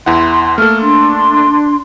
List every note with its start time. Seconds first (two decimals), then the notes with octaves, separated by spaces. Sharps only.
0.06 E2 E4 F#5 C6
0.58 A3 A#3 A4 F6
0.79 D4 C6